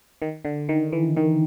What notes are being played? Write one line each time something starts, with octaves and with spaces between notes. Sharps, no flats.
D#3
D3
D#3
E3
D#3